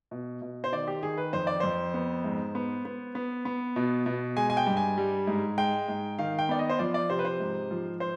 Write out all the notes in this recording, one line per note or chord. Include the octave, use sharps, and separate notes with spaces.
B2
B2
C5
D#3 D5
G4
D#3 G#4
B4
F2 C5
D5
F2 C5
B3
G#2
B3
B3
B3
B3
B2
B2
G#3 G#5
G#5
G5
G2
G#5
G3
G#2
G#3 G5
G#2
D#3 F5
G5
B3 D5
D#5
C5
F3 D5
D5
C3 C5
B4
C5
G#2
F3
C5